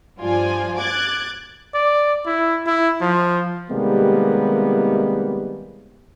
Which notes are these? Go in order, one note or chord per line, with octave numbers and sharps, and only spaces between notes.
G2 F3 F4 D5 G#5
D6 F#6 G#6 A6
D5
E4
E4
F3
C3 D#3 G3 G#3 A#3 B3